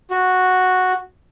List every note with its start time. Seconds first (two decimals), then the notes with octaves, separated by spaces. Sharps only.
0.11 F#4